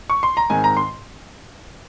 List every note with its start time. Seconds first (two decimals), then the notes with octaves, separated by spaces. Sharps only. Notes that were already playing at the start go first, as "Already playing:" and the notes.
0.10 C#6
0.23 C6
0.37 A#5
0.50 G#2 D#3 G#3 C4 G#5
0.64 A#5
0.77 C6